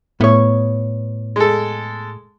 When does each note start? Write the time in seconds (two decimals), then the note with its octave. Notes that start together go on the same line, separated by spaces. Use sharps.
0.21 A2 B3 C#5
1.36 G#3 A4